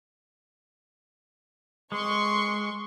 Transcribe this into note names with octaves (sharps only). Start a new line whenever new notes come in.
G#3 C6 C#6